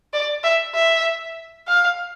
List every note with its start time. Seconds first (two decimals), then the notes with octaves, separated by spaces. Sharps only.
0.13 D5
0.44 E5
0.75 E5
1.68 F5